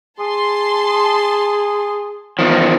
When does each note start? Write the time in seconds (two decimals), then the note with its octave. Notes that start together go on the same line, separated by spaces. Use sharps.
0.20 G#4 A5 C6
2.39 E2 D#3 F3